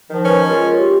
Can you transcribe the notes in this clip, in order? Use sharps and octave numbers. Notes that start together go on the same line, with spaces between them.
D#3 F3
C#4 B4
G#3 F4 A#4
G4